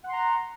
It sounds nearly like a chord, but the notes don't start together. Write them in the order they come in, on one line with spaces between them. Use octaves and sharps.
F#5 C6 A#5